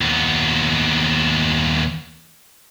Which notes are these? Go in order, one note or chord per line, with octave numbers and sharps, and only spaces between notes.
D#2 B3